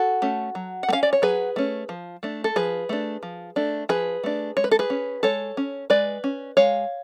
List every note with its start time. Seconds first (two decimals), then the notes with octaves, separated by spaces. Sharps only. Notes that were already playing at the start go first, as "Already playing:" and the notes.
Already playing: F#4 A4
0.22 A3 C#4
0.55 F#3
0.83 F#5
0.89 A3
0.93 C#4 F5
1.03 D5
1.13 C#5
1.22 F#3 G#4 B4
1.56 A3 C#4
1.89 F3
2.23 A3 D4
2.44 A4
2.56 F3 G#4 B4
2.89 A3 D4
3.23 F3
3.56 A3 D4
3.89 F3 G#4 B4
4.24 A3 D4
4.57 G#3 C#5
4.64 B4
4.71 A4
4.79 G#4 B4
4.90 C#4
5.23 G#3 A4 C#5
5.57 C#4
5.90 G#3 B4 D5
6.24 C#4
6.57 G#3 C#5 F5